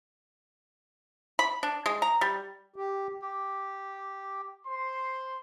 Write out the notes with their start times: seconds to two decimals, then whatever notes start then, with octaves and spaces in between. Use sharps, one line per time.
1.39 B5
1.63 D4
1.86 G#3
2.02 A#5
2.21 G3
2.76 G4
3.22 G4
4.65 C5 C6